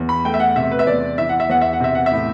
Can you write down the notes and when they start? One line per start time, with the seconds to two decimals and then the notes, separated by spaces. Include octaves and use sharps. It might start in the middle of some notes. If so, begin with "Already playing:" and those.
Already playing: E2
0.09 B5
0.25 A3 G5
0.34 E5
0.40 F#5
0.56 C3 E5
0.71 B4
0.79 E5
0.87 E2 D5
1.18 E3 E5
1.29 F#5
1.40 E5
1.49 E2 F#5
1.62 E5
1.73 F#5
1.80 C3 E5
1.95 F#5
2.06 E5
2.12 A2